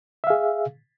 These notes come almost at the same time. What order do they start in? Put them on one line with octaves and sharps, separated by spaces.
E5 F5 G#4